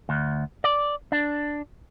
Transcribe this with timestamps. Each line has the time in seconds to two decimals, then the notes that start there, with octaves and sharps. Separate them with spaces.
0.09 D2
0.64 D5
1.12 D4